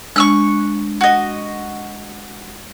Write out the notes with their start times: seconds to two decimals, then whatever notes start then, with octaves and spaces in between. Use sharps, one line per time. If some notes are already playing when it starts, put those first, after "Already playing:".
0.16 G#3 D4 C#6 E6 F#6
1.01 F#4 D#5